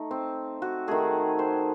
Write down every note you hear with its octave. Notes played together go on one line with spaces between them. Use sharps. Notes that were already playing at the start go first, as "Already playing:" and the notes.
Already playing: A3 D#4
C4
F#4
D#3 A3 G#4
C5